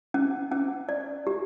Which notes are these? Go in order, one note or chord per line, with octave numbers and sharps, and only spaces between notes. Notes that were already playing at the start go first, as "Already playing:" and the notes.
C#4
C#4
D5
G4